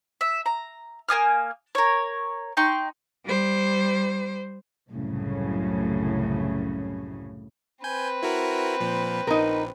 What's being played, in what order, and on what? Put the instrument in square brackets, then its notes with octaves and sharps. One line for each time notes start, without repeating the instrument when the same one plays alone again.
[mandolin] E5
A#5
A#3 G#5 D#6 F6
A#4 C#5
D#4 G5 C6 C#6
[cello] G3 C5
[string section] C2 F#2 A2 C#3
[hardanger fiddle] C4 B4 [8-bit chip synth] G#5 G6
[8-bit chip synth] E4 F#4 A#4
A#2 F3
[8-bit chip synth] A#1 [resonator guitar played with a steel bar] D#4 A#4